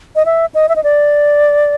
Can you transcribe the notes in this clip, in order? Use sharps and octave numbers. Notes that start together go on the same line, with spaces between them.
D#5
E5
D#5
E5
D#5
D5